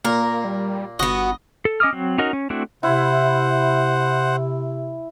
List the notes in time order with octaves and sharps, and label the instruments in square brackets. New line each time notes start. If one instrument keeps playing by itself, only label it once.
[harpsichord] A#2 [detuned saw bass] A#3 [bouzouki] A#4
[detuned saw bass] G3
[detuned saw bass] G1 [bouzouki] B3 F#4 [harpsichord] D#5
[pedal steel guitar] A4
C#4 D#5 D6 D#6 F6
F#3 C4
C#4 D#4 F#4 A#4 D#5
C#4
A3 C4 D4 E4 F#4
[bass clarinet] C3 [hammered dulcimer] E4 [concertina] C5 F#5